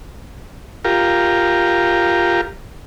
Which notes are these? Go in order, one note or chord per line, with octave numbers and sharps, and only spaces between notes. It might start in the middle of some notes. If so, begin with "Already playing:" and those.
F4 G4 A#4